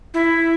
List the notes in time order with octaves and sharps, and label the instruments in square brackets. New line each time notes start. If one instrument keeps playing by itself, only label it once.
[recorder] E4